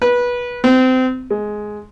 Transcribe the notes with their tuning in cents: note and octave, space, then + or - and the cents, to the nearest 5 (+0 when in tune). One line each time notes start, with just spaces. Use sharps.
B4 -20
C4 -25
G#3 +10